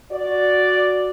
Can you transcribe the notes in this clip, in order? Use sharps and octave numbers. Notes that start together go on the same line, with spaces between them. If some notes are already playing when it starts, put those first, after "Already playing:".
F#4 D5